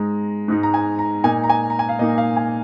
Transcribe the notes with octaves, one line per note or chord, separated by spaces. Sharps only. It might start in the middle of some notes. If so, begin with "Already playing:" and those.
Already playing: G#2 G#3 D#4 A#5
G#2 G#3 D#4
A#5
G#5
A#5
A#2 A#3 D#4 G#5
A#5
G#5
A#5
G#5
F5
A#2 A#3 D#4 D#5
F5
G#5